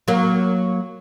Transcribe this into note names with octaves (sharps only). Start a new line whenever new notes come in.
F#3 A#3